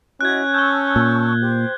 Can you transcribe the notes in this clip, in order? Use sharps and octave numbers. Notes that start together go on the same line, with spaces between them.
C#4 E4 F#4 D#5 F#6 G#6
A5 C#6 E6 G6 G7
A#2
G4 C5